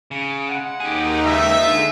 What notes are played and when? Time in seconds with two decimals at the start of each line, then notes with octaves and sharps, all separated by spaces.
0.11 C#3
0.49 G#3 F#5
0.80 D#2 D#4 G4 G#4
1.25 C#2 E5
1.59 D3 G#3 F4